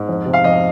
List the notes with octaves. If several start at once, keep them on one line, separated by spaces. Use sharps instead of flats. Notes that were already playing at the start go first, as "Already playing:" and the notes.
Already playing: G#2
F2
C3
F5
F2 D#5